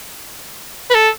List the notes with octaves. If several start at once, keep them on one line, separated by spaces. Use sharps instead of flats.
B4
A4